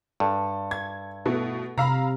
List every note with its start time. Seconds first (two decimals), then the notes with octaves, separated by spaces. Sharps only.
0.20 G2 A4
0.71 G#6
1.26 B2 A3 E4 B4
1.78 C3 F5 A#5 B5 E6